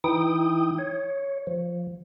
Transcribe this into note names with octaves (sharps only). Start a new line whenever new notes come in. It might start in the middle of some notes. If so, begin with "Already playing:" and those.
E3 D#4 E4 G5 D#6
C#5
F3